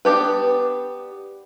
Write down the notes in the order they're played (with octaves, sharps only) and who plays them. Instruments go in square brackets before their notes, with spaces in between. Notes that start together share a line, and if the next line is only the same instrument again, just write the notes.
[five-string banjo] B3 D4 G4 B4